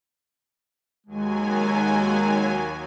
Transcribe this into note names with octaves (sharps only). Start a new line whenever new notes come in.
D#2 F#3 G#3 G#5